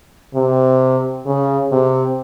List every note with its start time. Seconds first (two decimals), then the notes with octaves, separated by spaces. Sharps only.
0.35 C3
1.26 C#3
1.72 C3